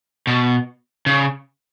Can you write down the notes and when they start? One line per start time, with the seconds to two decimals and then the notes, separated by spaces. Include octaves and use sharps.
0.27 B2
1.06 C#3